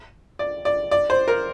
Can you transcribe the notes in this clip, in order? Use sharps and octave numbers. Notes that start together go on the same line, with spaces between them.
D5
D5
D5
C5
A#4